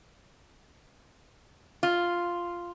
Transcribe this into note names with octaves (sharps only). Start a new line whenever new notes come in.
F4